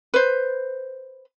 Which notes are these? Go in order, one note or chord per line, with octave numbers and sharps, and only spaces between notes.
B4 C5